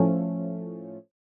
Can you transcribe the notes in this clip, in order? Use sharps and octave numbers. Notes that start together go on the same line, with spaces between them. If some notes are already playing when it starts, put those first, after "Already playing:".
Already playing: A2 F3 A3 C#4